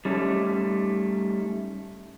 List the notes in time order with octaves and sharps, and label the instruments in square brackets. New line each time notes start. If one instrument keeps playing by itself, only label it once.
[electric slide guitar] G3 A3 C#4 D#4